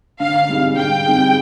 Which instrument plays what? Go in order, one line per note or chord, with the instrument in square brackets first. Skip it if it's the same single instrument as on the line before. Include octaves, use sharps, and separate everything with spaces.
[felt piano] D3 [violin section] F5
[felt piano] G3 C4 D#4 G#4
[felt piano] D3 [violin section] G5
[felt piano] G3 C4 D#4 G#4